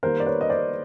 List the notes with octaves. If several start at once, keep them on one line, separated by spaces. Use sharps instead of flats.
D#3 G3 A#3 A#4 C5
D5
B4 C#5
D#5
C5 D5